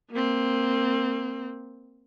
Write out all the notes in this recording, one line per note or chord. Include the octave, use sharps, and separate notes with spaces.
A#3 C4